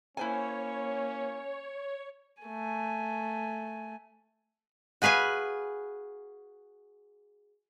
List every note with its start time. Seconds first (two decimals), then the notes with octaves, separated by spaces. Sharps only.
0.17 A#3 C#4 E4 C5 C#5 G#5
2.43 A3 G#5
5.02 F#4 G#4 B4 F5 G#5